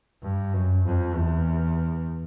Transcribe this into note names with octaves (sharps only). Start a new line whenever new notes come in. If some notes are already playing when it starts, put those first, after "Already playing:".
G2
F#2
F2
E2